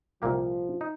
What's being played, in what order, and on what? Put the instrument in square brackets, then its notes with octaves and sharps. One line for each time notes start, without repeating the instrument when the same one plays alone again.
[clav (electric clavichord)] C2 A#2 A#3 G4 [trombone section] F3
[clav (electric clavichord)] D#4